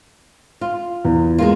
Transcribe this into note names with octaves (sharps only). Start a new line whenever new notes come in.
F4
E2
G#3 A#3 F4